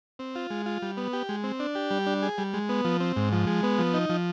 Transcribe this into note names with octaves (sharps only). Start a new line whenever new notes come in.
C4
F4
G#3
F4
G3
B3
G4
G#3
C4
D4
G4
G3
D4
G#4
G3
G#3
B3
F3
C4
G#2
F3
G#3
B3
F3
D#4
F3